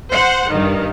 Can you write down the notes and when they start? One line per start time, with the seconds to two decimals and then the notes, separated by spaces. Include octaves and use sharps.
0.11 C5 F#5
0.49 G2 D#3